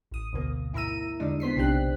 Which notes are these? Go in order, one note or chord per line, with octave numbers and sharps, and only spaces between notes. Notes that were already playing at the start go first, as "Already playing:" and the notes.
A1 D#6
D2 B2 A#3
G#2 E4 A#4 A#5 E6 D#7
E2 D3 G3 G#3 D4 D#4
B3 C5 B6 C7
B1 C3 C4 D4 G4 F#6